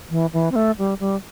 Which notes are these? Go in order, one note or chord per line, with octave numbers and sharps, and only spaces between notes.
E3
E3
C4
A3
G3
G3